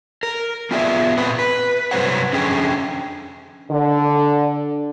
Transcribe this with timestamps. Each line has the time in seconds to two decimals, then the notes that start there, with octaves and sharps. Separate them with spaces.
0.23 A#4
0.71 B3 F4 G4 G#4 D5 E5
1.17 A#2 C4 B4
1.39 B4
1.91 G2 C3 F#3 C5 C#5 F#5
2.33 F2 D3 C#4 G#4 G5
3.70 D3